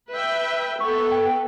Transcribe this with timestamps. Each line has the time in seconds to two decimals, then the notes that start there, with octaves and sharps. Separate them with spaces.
0.11 B4 E5 G5
0.80 B3 A4 C#6
1.12 G5